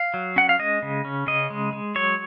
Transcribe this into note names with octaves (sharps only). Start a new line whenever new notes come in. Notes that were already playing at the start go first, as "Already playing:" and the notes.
Already playing: F5
F#3
C#4 F#5
F5
G#3 D#5
C#3
C#4
C#3 D#5
G#3
G#3
F#3 C#5